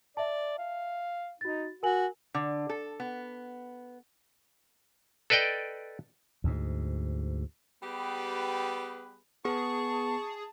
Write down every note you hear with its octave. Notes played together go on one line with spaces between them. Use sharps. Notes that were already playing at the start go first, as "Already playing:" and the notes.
D5 E5 A5
F5
D#4 F#4 A6
F#4 A#4 G#5 F#7
D3
A4
B3
A4 B4 D5 D#5 G5
D2 G#2
G3 B3 G4 G#4 B4
B3 G#4 A5 C#6